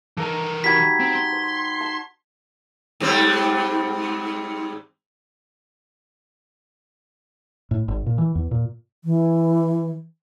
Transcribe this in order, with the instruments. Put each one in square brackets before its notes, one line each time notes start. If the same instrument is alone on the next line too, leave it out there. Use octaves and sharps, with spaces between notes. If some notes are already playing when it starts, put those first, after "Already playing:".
[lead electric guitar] E3 A#4 [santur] A4 A#5
[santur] G3 D#4 F#4 [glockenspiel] G#6 B6
[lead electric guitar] C4
C6
[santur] C5
A5
[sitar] G#2 G3 C4
[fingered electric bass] A2
G#1
A#2
E3
E2
A#2
[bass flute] E3